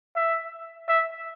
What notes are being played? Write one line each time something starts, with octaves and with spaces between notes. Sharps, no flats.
E5
E5